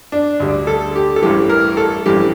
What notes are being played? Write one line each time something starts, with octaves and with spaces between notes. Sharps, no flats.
D4
D2 D3 G3
A4
G4
A4
A1 G2 E3 G4
A#4
A4
A1 G2 E3 G4